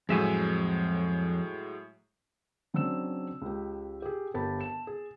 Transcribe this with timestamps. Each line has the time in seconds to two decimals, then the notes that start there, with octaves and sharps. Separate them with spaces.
0.09 F2 A2 F#3 G#3 E5 G#5
2.74 C#3 F#3 C4 D4 E6 E7
3.42 C#2 G4
4.02 G4 G#4
4.34 G1 G4 A#4 A5 B5 A6
4.61 A5 E7
4.87 G#4